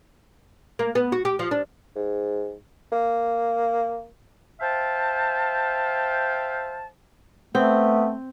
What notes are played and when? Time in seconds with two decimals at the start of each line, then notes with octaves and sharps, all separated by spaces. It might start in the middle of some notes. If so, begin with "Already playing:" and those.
0.79 A#3
0.95 B3
1.12 F#4
1.25 G4
1.39 F3
1.51 D4
1.96 G#2
2.92 A#3
4.61 C5 E5 F5 G5 A5
7.55 A3 B3 C4